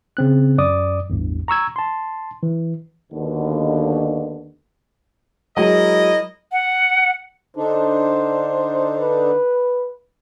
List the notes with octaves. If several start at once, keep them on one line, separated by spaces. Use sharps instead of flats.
C#3 C4 F#6
F#2 D5 D6 D#6
A1 E2 G2
A#5 C#6 E6 G#6
A5 C6
E3
D#2 B2 D3
F#3 G#3 E4 A#4 D#5
F#5
D3 D4 D#4 C5
B4